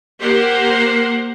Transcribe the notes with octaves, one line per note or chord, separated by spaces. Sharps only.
A#3 G4 A#4 C5 F#5